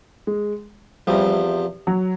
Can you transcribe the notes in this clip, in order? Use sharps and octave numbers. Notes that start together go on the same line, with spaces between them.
G#3
E2 C3 F3 G3
F#3